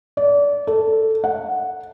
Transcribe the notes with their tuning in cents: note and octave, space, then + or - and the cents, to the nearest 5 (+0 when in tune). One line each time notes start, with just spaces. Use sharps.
D5 -30
A4 +5
F#5 -5